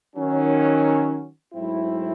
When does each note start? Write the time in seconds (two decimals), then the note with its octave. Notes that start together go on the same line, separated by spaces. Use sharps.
0.16 D#3 F#3 C#4
1.54 G#2 F#3 A3 C4 E4